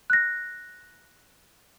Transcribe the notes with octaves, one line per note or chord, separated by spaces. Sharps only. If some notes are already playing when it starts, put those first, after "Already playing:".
F#6 A#6